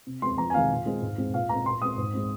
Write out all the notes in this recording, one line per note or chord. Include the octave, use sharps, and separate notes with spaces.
C3
G#3 C4 C6
F2 A#5
G#5
C3 D#3 G#3 F5
A#2
G#3 C4
G#2
G#3 C4
A#2 F5
G#3 C4 A#5
A#2 C6
G#3 C4 D#6
G#2
G#3 C4